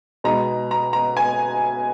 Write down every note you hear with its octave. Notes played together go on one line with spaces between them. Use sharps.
B2 G#3 D#4 A#5
A#5
A#5
G#5